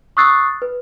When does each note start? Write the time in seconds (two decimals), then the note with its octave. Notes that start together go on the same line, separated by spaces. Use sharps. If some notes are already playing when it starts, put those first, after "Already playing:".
0.17 C#6 D#6 E6 F#6 A6 C7
0.62 B4